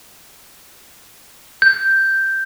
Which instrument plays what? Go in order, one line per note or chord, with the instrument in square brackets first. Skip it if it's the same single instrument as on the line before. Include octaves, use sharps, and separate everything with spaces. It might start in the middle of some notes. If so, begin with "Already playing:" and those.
[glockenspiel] G6